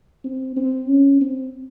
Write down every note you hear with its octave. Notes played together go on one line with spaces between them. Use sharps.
C4
C4
C#4
C4